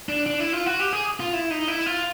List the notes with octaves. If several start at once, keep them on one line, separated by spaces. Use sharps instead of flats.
D4
D4
E4
F4
F#4
G4
G#4
F4
E4
D#4
E4
F4